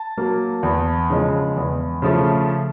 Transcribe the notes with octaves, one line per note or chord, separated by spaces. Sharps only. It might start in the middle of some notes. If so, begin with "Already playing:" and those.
Already playing: A5
F#3 A#3
E2
C#3 F3 G#3
E2
C#3 F3 A3